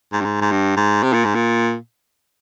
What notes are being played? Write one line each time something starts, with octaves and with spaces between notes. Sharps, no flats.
G#2
G2
G#2
G#2
G2
G#2
C3
A#2
G#2
A#2